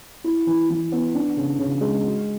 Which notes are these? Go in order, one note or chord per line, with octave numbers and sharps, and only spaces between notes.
E4
E3
E3
B3
D4
C#3
C#3
G#3
F#4